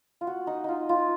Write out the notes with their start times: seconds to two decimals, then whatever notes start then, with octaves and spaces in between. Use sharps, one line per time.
0.21 F4
0.27 F#4
0.47 D#4
0.64 D#4 F4
0.89 F4